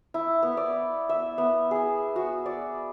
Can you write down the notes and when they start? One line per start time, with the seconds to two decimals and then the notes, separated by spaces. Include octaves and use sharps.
0.14 E4
0.43 B3
0.57 D5
1.09 E5
1.38 B3
1.71 G#4
2.16 F#4
2.46 D5